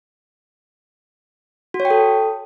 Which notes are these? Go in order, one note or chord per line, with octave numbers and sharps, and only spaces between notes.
F#4
C#5
G5
A4